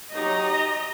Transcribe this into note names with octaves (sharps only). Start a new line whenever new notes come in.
F#3 D#4 G4 D#5 A#5